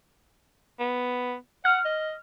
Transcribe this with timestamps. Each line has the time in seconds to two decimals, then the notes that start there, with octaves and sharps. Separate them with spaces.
0.80 B3
1.65 F#5 F6
1.85 D#5